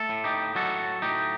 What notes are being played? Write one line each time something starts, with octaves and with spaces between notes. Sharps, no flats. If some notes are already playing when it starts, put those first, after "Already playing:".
Already playing: A3 A4
A2
D#4 G4
F#3 F#4 A4
A2 D#4 G4